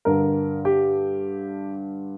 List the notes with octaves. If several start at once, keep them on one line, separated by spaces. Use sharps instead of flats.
G2 D3 A#4
G4